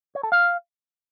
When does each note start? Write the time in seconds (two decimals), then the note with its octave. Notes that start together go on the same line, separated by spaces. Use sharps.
0.15 C#5
0.23 A4
0.32 F5